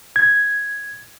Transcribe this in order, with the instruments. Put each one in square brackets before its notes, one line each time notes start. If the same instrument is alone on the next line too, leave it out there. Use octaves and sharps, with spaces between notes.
[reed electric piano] G#6